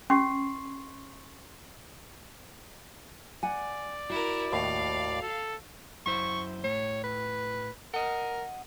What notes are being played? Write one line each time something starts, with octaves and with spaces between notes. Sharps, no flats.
C#4 C6 C#6 C7
D5 F#5 G#5
E4 F#4 A#4
D#2 A2 F5
A4
F#2 E4 C5 C#6
A2 C#5
B4
A#4 D#5 F#5